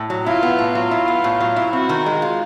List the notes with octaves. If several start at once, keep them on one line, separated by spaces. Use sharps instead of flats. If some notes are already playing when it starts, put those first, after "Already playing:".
Already playing: A2
F#3
E4 F4
B3
A2
F#3 F4
E4
B3
A2
F#3
E4
C4 F#4
D#3
G#3
F4